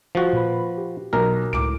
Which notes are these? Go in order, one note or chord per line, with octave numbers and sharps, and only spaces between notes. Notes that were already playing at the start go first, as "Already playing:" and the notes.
F3 F#4
A#2 B4 B5
G4
B1 A#4 A#5
C#2 A2 D6 D7